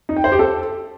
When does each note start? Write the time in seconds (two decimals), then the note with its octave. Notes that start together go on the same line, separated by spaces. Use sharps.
0.09 D#4
0.16 G5
0.24 C5
0.32 G4
0.39 A4